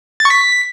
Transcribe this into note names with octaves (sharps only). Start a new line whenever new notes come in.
A6
C#6
B6